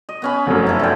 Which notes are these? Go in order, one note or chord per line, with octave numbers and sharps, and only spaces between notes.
D#5
B3 C#4 B5
F1 F#2
E4 A4
D3 G5